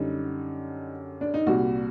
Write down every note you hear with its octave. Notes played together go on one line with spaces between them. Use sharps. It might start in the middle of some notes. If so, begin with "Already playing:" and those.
Already playing: F#2 D3 G3 D#4
D4
D#4
C2 A#2 G3 F#4